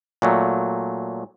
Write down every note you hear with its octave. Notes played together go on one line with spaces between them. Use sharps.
A#2 F#3 A3